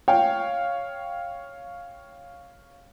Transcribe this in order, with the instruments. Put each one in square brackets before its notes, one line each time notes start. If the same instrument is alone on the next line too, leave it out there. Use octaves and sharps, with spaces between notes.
[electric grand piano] C#5 F5 [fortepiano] G5